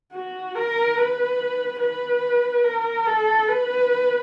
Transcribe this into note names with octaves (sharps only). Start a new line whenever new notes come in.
F#4
A#4
B4
B4
A#4
A4
B4